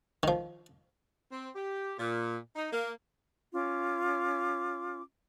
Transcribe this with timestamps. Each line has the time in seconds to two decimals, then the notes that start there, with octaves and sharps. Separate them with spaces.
0.23 D#3 F3
1.31 C4
1.55 G4
1.99 A#2
2.56 D#4
2.73 A#3
3.53 C#4 F4 D6